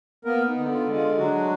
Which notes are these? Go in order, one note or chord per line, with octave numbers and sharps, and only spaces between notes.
A#3 B3 A#4
D#4
D3
F4
G#3
F4
F#3 D4 F#4